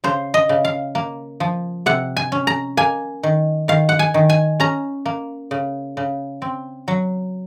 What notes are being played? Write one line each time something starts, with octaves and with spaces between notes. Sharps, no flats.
C#3 C5
D#5
C#3
F5
A#3
F3
C3 F#5
G#5
C#4
A#5
A#3 G#5
D#3
D#3 F5
F#5
G#5
D#3
G#5
C#4 A#5
A#3
C#3
C#3
C4
F#3